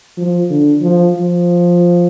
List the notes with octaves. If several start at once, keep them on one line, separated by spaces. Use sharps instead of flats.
F3
D3
F3
F3